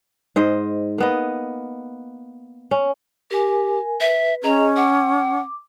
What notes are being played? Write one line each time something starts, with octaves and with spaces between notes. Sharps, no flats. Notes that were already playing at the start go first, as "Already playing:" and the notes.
G#2 C5 D#5
A#3 B3 D#5
C#4
G4 A#4 G#5
B4 E5
C#4 G#4 D#5 A#5
F#5 D6